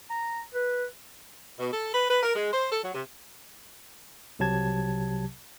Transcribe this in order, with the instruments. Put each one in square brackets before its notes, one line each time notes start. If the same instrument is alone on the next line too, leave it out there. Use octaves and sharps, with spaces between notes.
[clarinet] A#5
B4
[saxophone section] B2
A4
B4
B4
A#4
G#3
C5
A4
F#3
C3
[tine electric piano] C2 C3 F#3 G4 A5 G#6